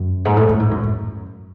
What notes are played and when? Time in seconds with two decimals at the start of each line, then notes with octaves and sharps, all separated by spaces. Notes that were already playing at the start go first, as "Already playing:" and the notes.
Already playing: F#2
0.25 G#2
0.36 A2
0.49 A2
0.60 G#2
0.71 F#2
0.83 F#2